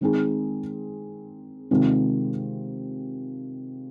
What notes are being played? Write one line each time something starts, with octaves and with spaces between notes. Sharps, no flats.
D#3 G#3 C4 D#4 G#4
C3 D#3 G#3 C4 F4